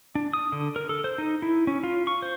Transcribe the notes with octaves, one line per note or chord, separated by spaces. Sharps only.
D4
D#6
D3
A#4
A4
C5
D#4
E4
C#4
F4
C#6
C5